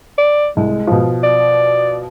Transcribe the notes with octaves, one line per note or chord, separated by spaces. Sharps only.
D5
C2 G#3
B2 F3
D5